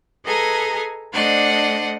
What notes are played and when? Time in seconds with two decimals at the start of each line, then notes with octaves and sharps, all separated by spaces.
0.24 G#4 A4 B4 D#5 G#5 A#5
1.13 A3 D4 C5 D5 D#5 F#5